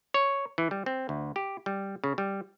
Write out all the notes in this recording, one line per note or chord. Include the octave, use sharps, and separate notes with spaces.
C#5
E3
G3
C4
D2
G4
G3
C#3
G3